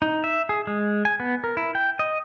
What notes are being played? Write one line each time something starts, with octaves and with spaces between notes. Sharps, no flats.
D#4
E5
G#4
G#3
G#5
B3
A#4
E4
G5
D#5